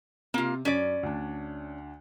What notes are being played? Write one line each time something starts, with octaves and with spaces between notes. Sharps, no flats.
C3 A#3 F4
F#2 C#4 D5
D2 D4